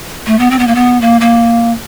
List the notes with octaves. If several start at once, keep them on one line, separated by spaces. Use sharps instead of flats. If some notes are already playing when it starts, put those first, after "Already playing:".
A3
B3
C4
B3
A#3
B3
A#3
A#3